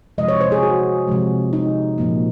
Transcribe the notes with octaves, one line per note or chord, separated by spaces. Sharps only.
C3 F3 G#3 D#5
C#5
C5
G#4
F#4
C3 F3 G#3
D#4
A#2 F3 A#3